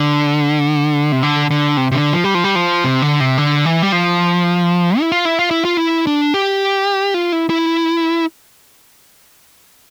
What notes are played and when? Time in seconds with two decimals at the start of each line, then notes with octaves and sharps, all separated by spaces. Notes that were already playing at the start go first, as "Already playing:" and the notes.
Already playing: D3
1.12 C3
1.23 D3
1.51 D3
1.77 C3
1.92 C3
1.94 D3
2.13 F3
2.24 G3
2.35 F3
2.44 G3
2.55 F3
2.84 C3
3.02 D3
3.20 C3
3.38 D3
3.65 E3
3.83 G3
3.92 F3
5.00 E4
5.12 F4
5.25 E4
5.39 F4
5.51 E4
5.65 F4
5.77 E4
6.07 D4
6.34 G4
7.14 F4
7.32 E4
7.50 E4